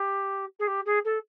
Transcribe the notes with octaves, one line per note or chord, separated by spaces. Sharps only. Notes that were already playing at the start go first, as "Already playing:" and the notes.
Already playing: G4
G#4
G4
G#4
A4